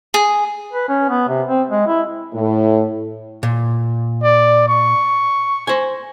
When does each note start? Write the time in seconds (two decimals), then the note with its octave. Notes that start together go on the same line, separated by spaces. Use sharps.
0.14 G#4
0.73 B4
0.89 C#4
1.09 B3
1.29 C3
1.48 C4
1.70 G#3
1.87 E4
2.33 A2
3.43 A#2
4.23 D5
4.68 C#6
5.67 C5 G#5